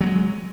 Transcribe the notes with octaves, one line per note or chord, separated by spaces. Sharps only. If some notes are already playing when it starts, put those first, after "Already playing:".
F#3 G#3 B3